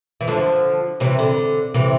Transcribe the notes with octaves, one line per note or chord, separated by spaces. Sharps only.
E3
D3 F3
C3 E3
D3
C3 E3